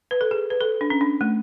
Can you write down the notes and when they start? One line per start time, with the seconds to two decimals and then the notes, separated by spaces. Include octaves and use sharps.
0.11 B4
0.21 A4
0.31 G#4
0.50 B4
0.61 A4
0.81 D4
0.90 C#4
1.01 D4
1.21 A3